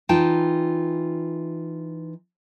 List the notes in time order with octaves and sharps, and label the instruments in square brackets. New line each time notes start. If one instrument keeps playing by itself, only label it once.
[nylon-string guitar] E3 D#4 F4 G5 A5